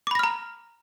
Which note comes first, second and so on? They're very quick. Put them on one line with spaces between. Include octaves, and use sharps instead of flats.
D6 B5 A#6 F6 A#5